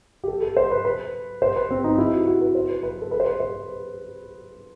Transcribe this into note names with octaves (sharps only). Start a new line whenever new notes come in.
G4
A4
A4
C5
B4
B4
C5
B4
C4
D#4
E4
F#4
F#4
B4
C5
B4
B4
A4
B4
C5
B4
C5